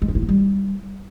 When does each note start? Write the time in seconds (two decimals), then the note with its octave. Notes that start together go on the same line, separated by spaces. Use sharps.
0.02 G#3
0.08 C#4
0.15 E4
0.22 B3
0.29 G3